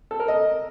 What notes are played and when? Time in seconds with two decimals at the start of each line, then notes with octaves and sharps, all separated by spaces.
0.11 A4
0.20 A#4
0.28 D#5